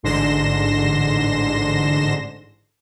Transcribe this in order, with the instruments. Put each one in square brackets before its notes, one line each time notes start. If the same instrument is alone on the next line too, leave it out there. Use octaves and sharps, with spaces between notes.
[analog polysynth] A1 G#2 D3 C6 A#6 E7